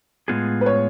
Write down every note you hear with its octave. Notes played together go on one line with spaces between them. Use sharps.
A2 G#3 B3 F4 G#4
B4
C#5